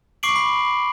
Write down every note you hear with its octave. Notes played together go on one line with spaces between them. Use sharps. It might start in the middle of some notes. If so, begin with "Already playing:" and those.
C#6 D6 C7 D7 F#7
B5